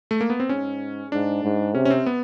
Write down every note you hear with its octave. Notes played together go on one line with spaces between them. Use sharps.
A3
A#3
B3
C4
G#2 C#4
G#2 D4
G#2
C3 C#4
C#4
C4
B3